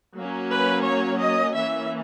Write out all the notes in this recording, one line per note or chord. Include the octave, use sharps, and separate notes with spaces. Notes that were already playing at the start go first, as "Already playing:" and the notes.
F#3 A#3 C#4
B4
C#5
D#5
E3 A#3 C#4 E5